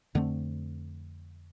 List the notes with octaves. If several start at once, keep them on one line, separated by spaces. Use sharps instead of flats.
F2 D3 A3 C4